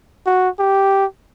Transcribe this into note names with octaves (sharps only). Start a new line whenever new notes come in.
F#4
G4